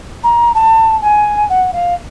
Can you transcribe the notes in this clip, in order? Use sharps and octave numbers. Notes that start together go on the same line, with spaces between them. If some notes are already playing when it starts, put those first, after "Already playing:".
A#5
A5
G#5
F#5
F5